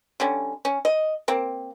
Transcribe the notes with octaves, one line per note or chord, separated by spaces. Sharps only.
D3 G3 C#4
C#4
D#5
A#3 C4